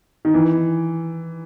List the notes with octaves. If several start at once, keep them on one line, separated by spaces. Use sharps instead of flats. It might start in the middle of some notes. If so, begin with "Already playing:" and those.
D#3
E3